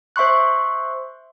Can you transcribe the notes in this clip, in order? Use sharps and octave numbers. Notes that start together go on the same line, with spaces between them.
C5 E5 C6 C#6 F#6